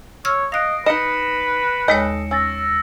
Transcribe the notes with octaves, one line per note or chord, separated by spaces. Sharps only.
C#5 E6 F6 G#6
D#5 F5 F#6 A#6 C7 D7
D#4 B4 D#5 A#6 C#7 E7
D#2 G#3 A4 C#5 D#5
C#4 E6 A6 A#6